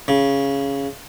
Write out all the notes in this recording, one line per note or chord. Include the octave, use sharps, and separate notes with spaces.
C#3